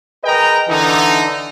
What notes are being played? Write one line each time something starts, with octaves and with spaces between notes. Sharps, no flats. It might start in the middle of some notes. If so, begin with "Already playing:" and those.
G#4 A#4 B4 D#5 G5 A#5
D3 E3 D#4